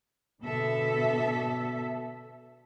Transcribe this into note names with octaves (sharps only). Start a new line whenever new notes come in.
B2 D3 A4 E5